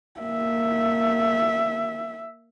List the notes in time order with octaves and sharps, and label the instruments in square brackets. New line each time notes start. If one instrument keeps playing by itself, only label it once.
[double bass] A#3 [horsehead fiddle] E5